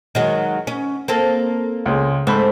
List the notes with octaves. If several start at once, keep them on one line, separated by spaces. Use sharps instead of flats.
D#3 F#3 G#3
C#4
A#3 C4 A4
C#2 G#3
G#2 A3 C4 B5